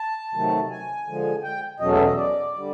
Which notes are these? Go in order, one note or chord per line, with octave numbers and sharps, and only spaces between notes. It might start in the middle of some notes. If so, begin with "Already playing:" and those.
Already playing: A5
C3 D#3 F#3 A3
G#5
D3 F3 G#3
G5
E2 B2 F#3 A3 C#4 D#5
E5
D#5
D5
D3 G3